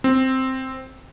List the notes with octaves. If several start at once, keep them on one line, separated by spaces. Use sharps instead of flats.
C4